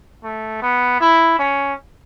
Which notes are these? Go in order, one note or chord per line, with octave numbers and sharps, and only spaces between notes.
A3
B3
E4
C#4